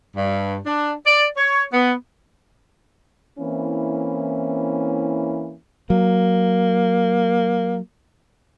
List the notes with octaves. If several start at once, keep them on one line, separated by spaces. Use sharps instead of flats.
G2
D4
D5
C#5
B3
E3 A#3 C4 C#4 E4
F#3 A#3